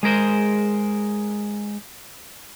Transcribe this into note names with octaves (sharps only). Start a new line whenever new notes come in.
G#3 G#4 A#4 C5